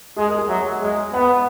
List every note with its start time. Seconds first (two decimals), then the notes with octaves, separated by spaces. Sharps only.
0.16 G#3 G#4
0.28 A#4
0.38 G#4
0.49 F#3 E5
0.81 G#3
1.13 B3 F#5